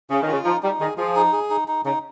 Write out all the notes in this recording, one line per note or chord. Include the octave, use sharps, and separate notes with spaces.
C#3 C#4
D#3
F4
C#3
F3 D#4
G3 D#4
D#3 G#4
F3 G#4
D#4
G#4
D#4
D#4
C#3 D#4